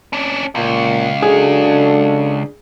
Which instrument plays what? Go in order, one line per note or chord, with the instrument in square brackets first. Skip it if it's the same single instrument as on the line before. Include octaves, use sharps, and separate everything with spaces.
[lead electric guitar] C#4 D4
[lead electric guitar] C#2 [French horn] A#2
[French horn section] F#3 F#4 A4 [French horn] D4 [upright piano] G#4